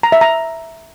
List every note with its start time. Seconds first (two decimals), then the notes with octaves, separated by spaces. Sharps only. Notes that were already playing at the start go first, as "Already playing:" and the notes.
0.03 A#5
0.12 E5
0.21 A#5